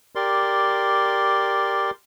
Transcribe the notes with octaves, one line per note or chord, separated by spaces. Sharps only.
G4 A#4 D5 C6